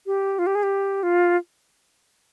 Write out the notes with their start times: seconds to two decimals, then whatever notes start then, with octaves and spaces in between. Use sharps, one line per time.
0.06 G4
0.39 F4
0.47 G4
0.55 G#4
0.63 G4
1.03 F4